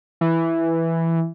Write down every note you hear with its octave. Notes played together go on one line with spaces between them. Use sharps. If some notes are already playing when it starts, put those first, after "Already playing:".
E3